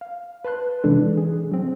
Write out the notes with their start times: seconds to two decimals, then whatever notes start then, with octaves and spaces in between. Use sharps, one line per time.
0.01 F5
0.45 B4 A5 C6 F#6
0.84 C3 E3 G#3 D4 A4
1.17 G#4
1.52 F#3 C4